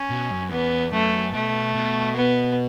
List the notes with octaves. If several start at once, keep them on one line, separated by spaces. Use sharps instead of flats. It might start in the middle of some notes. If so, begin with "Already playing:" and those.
Already playing: C#4
B2
F#2
E2 B3
F#2 A3
B2 A3
B2
B3